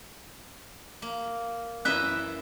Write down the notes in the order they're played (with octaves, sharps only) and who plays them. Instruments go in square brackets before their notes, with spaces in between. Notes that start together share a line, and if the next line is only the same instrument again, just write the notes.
[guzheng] A#3
[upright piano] F#2 E3 [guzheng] E4 D#5 E5 [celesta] F#6